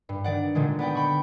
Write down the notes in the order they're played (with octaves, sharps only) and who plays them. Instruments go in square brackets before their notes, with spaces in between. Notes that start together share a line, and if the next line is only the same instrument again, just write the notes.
[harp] G2
D#3 D5 F#5
A#2 D3 D#3 G#3
B3 D5 F#5 G5
G5 B5 C#6